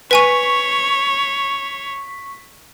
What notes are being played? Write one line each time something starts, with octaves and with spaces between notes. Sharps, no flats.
B4 C#5 G#5 C#6 B6 D#7